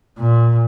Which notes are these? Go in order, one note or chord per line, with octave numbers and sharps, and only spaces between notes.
A#2